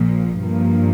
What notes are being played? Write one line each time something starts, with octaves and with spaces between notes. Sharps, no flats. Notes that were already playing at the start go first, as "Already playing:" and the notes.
Already playing: A#1 A#2 F3
G2 F3 A#3